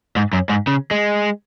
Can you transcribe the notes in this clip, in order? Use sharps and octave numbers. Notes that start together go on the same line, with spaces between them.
G#2
F#2
G#2
C#3
G#3